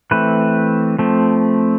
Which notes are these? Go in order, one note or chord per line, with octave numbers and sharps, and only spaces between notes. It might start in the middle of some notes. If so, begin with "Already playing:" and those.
E3 A3 C4 B4
F3 A3 C4